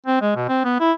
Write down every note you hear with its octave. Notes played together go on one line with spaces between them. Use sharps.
C4
G#3
B2
C4
B3
E4